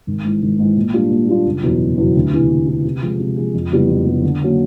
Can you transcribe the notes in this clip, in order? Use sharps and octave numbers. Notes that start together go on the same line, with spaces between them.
G#1
G#2 E3
G#1
G#2 E3
A#2
G3 A#3 D4 F4
A#2
G3 A#3 D4 F4
F#1
E2 B2 F#3
F#1
E2 B2 F#3
D2
C3 E3
D2
C3 E3
C3
F3 G#3
C3
F3 G#3
F2
C#3 E3 G3 B3
F2
C#3 E3 G3 B3
D3
F#3 A#3 C#4